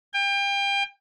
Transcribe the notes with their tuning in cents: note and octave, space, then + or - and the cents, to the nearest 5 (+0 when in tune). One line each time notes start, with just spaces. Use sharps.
G5 +30